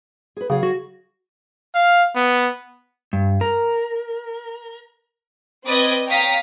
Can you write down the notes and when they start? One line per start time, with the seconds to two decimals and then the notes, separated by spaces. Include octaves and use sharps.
0.37 G#4 B4
0.50 C#3 F#3 G#4 F5
0.63 F#4
1.75 F5
2.15 B3
3.13 G2
3.41 A#4
5.64 C4 B4 D5 D#5 D#6 G#6
6.08 C#5 F5 G5 A#5 D#6 B6